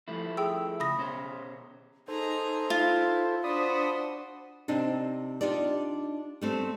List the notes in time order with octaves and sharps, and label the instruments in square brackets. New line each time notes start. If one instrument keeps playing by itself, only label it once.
[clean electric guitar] F3 A3 E4
[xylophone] G#4 G5 E6
[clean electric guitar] C#3 [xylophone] B5 D#6 A#6
[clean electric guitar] B2 C#4 C5
[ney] D#4 [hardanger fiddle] G#4 A#5 [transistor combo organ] A4 C5
[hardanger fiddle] E4 [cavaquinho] F4
[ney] D4 [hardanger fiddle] F#4 C5 [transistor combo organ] D5 B5 D#6
[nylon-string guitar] C3 C4 D4 D#4
D4 D#4 F4 G4 D5
G3 A3 C4